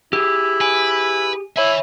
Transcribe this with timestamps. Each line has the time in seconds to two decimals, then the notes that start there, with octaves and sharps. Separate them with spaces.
0.13 E4 G4 G#4 E6
0.61 B4 G#5 D7
1.57 E4 C#5 E5 G#5 B5